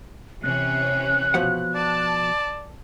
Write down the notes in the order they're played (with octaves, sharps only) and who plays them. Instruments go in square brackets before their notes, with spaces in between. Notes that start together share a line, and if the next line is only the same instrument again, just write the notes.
[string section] C3 E3 C#4 [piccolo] F#6
[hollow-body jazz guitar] B2 F3 F#5
[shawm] D5 [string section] A5